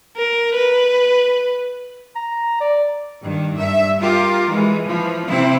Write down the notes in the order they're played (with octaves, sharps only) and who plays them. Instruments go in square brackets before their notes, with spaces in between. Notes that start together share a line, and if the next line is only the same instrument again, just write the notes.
[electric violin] A#4
B4
[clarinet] A#5
D5
[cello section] G2 D#3
G2 E5
F4 G4 A#4
E3 G#3
E3 F3
C3 C4 E4